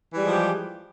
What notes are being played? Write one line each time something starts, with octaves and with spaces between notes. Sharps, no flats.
E3 F3 G3 G#3 G4